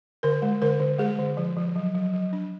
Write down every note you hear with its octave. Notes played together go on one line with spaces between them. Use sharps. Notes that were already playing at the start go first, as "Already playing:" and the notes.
D3 A#4
G#3
D3 A#4
D3
G#3 G#4
D3
F3
F3
F#3
F#3
F#3
D4